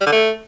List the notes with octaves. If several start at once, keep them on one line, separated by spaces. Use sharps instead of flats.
G3
D3
A3